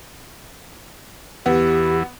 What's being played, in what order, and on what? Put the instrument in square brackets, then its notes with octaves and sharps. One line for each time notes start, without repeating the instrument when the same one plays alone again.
[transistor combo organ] E2 E3 [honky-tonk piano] B3 [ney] G4